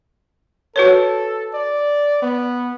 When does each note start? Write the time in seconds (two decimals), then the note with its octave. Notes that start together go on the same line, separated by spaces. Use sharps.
0.76 F#4 A4 B4 C#5
1.54 D5
2.22 B3